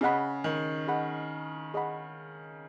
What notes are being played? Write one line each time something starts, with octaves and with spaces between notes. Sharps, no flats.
C#3 G#4 D#5 F#5 B5
D#3
G#4 D#5 F#5 B5
G#4 D#5 F#5 B5